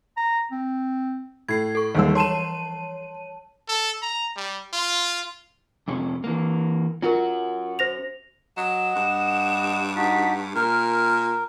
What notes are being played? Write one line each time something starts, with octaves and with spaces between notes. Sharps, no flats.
A#5
C4
A2 G#6 C7
A4 C#6
D#2 E3 F3 G3 G#3 E6
C#5 A5 C6 D#7 E7
A4
A#5
G3
F4
F2 C3 C#4
E3 A#3
C#4 F4 F#4 A#4
C5 A#6 F7
F#3 D#5 F#5 E7
G2
D#4 F#4 A5 B6
A#2 A#4 F6